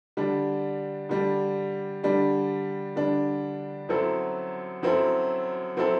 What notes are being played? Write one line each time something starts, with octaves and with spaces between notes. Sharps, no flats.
D3 G3 D4
D3 G3 D4
D3 G3 D4
D3 G3 D4
F#2 F#3 C4 E4 A4
F#2 F#3 C4 E4 A4
F#3 C4 E4 A4